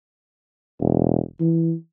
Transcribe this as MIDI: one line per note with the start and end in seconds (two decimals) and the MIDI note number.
0.80 1.20 28
1.40 1.74 52